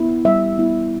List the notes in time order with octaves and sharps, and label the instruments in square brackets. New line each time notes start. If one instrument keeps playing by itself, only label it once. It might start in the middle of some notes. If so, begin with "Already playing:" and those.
Already playing: [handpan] B3 E4
G3 E5
B3 E4